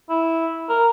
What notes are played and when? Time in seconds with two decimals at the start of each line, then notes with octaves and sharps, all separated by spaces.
0.09 E4
0.69 A#4